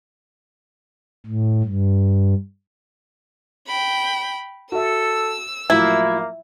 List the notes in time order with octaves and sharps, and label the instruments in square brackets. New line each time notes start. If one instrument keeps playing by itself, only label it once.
[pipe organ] A2
G2
[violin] G5 B5
[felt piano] F#4 E5 [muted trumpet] A4 [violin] E6
[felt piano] A2 F3 F#3 [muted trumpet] A#3 [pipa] E4